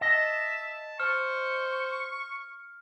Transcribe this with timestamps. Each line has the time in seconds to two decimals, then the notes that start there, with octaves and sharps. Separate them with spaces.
0.01 D#5 E5 A5
1.00 C5 C#6 F6